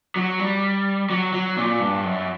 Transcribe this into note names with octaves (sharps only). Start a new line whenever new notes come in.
F#3
G3
F#3
F#3
A#2
G2
F#2